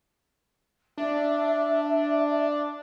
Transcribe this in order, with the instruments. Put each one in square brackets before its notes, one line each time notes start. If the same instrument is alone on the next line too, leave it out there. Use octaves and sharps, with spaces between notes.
[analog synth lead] D4 [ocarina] E5